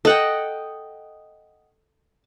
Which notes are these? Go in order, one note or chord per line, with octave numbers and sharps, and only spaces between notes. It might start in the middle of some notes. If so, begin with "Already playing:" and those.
A4 D#5 F#5 G5